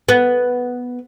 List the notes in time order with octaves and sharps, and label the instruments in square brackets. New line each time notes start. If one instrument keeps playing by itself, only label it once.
[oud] B3